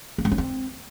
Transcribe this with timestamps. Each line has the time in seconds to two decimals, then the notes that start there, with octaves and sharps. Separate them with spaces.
0.18 A#3
0.25 G#3
0.32 C#4
0.38 C4